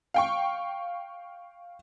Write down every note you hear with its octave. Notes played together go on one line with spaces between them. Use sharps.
F5 G5 C#6